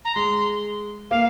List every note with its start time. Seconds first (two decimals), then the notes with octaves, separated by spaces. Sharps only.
0.05 A#5
0.15 G#3 C6
1.11 A#3 F5